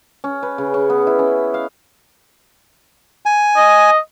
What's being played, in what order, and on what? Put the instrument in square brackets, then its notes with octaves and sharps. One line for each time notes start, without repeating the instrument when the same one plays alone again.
[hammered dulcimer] C#4
B4
C#3
C#4
B3
E4
C#4
F5
[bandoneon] G#5
[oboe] D#5